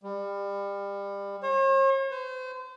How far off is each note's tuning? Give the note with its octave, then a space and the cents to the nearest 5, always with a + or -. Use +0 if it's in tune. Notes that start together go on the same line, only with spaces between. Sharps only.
G3 +30
C#5 -45
C5 -35